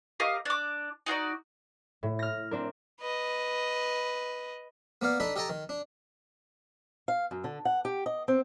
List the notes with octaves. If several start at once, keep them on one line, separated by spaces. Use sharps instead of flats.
G4 A#4 D#5 F5
D4 D6
D#4 F#4 C5 D5
A2
F6 A#6
C4 D4 A#4
B4 D#5
A#3 B3 D5 F5
D4 D#4 A4 B5
G4 A4 D#5 G5 A5 A#5
D#3
D4
F5
F#2
D3
F#5
G4
D#5
C4